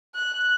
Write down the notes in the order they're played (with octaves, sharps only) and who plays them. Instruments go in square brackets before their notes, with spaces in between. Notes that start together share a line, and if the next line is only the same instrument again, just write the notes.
[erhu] F#6